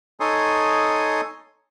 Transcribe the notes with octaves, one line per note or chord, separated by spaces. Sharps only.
D#4 A4 C#5 G#5 C6 D#6